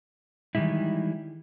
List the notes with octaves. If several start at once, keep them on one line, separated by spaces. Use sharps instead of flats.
D#3 E3 G3 G#3 E4